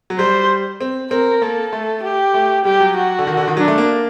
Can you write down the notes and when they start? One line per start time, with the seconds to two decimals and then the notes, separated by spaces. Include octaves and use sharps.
0.10 F#3
0.18 G3 C5
0.81 C4
1.11 C4 A#4
1.42 A#3 A4
1.73 A3
2.03 G4
2.34 A3
2.65 G3 G4
2.80 F#3
2.96 F#4
3.19 D3
3.27 D#3
3.37 D3
3.48 D#3
3.57 F#3 D4
3.68 A3
3.78 A#3